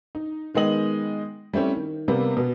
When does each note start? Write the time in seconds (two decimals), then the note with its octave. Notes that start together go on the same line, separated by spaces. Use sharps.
0.15 D#4
0.55 D#3 G#3 B3 D#5 F#7
1.54 G3 A3 C4 C#4 E4
1.76 D#3
2.08 C3 G3 A#3 B3
2.37 B2 B3